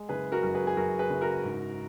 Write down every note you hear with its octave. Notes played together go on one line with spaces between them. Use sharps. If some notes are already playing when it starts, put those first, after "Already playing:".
Already playing: G#3
F#1 G#4 B4
F#4 A#4
F#2 A#4
G#4 B4
G#4
F#2 F#4 A#4
G#4 B4
F#1
F#4 A#4
G#2